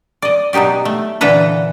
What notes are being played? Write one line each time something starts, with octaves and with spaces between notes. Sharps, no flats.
D5 D#5
B2 F#3 D#4 G4 D5
A3
A#2 D3 E3 A4 B4 A#5